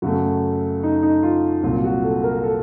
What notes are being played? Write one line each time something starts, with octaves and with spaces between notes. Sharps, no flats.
F#2 C#3 A3 F#4
D#4
D#4
F4
C2 A#2 F#3 F4
F#4
A4
A#4
A4